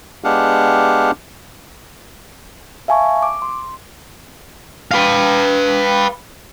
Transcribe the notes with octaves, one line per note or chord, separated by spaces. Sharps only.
G#3 B3 D4 G4 F5 F#5
E5 F5 G#5 A5 C#6
D6
C6
B4 F5